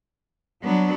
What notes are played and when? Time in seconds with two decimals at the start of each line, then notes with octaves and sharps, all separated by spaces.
0.64 F#3 B3 D4